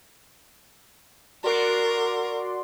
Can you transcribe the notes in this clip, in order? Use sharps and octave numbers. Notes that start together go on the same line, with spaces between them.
F#4 A#4 D5 C6